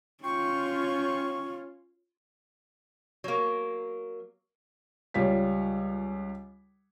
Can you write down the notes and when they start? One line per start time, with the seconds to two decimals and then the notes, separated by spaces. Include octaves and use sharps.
0.24 C#4 F4 G5 C6 C#6
3.24 F#3 A#3
5.14 C#2 G3 F4 C#5 B6